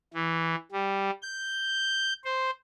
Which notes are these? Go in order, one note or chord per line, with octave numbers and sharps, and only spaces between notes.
E3
G3
G6
C5